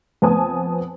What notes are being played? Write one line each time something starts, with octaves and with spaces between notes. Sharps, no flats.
F2 B3 G#5 A5 D#6